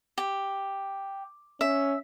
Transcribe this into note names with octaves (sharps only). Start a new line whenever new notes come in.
G4
C#4 E5